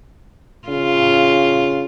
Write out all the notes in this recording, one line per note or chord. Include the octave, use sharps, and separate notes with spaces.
C#3 F4